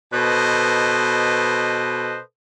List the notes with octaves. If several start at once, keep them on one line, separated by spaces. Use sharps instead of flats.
B2 A4 B4 C5 D#5